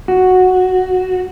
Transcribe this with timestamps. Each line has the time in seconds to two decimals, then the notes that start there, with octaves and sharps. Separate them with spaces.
0.08 F#4